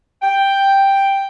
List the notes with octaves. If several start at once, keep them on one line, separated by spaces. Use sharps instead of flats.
G5